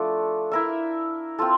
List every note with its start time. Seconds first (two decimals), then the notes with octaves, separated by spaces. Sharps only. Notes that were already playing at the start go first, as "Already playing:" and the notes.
Already playing: F3 A3 D4 A4
0.51 E4 A#4 E5
1.39 C4 F4 A4